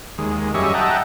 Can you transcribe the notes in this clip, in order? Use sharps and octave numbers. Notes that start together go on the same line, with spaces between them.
D#2 G#3
F#2 G3 G#4 D#5 E5 C#6
D#5 E5 F#5 G5 A5 A#5